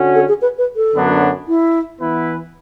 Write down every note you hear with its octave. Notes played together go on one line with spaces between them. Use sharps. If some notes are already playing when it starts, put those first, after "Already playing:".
Already playing: D3 C#4 F#4
A4
G#4
B4
B4
A4
F#2 D3 F#3 B3 D4
E4
E3 B3 E4 B4